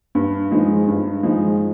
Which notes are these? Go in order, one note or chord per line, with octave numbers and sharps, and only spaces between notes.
G2
F3 G#3 D#4
G2
F3 G#3 D#4